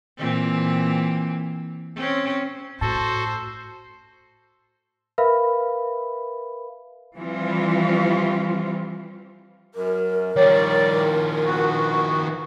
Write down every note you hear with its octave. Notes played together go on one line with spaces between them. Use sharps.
A#2 E3 C4
C4 C#4
A2 F#4 A4 C5 A5
A#4 B4 E5 F5 B5
E3 F3 G3 C4 F4
F#2 A#4
D#3 F3 G3 C#5 D5
B3 F#4